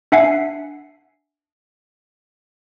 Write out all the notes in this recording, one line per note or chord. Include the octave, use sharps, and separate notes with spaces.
D4 E5 F#5 G#5 C7